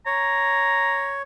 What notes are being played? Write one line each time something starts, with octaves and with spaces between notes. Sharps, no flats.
C#5 A#5